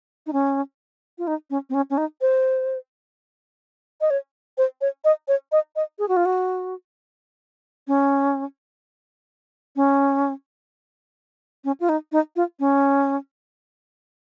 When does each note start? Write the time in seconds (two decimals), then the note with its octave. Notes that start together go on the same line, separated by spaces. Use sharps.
0.27 D#4
0.33 C#4
1.18 F4
1.27 D#4
1.50 C#4
1.70 C4
1.74 C#4
1.90 C#4
1.98 D#4
2.21 C5
4.01 D#5
4.10 C#5
4.58 C5
4.81 C#5
5.05 D#5
5.28 C#5
5.52 D#5
5.76 D#5
5.99 G#4
6.08 F#4
6.17 F4
6.25 F#4
7.88 C#4
9.76 C#4
11.65 C#4
11.80 F4
11.89 D#4
12.12 D#4
12.36 F4
12.60 C#4